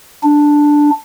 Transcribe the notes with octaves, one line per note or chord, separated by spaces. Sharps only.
D4